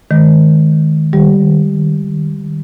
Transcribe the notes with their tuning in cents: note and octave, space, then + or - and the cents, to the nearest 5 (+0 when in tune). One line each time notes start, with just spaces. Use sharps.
D#3 +0 G#3 +30
D#3 -30 G3 +0 G4 -5